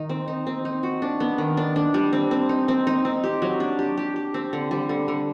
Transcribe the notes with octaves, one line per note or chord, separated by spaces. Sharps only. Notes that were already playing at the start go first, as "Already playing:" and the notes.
Already playing: D#3 D#4
C4
D#4
C4
D#4
F#4
D4
B3
D#3
D4
D4
G3
C4
C4
D#4
C4
D#4
C4
G4
F#3
D4
G4
G4
G4
C4
D3
G3
D3
D3